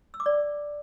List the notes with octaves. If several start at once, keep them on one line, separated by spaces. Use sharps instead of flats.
E6
D6
D5